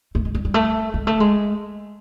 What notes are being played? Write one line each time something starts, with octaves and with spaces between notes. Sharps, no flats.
A3
G#3
G3
G3
A3
G#3
A3
G#3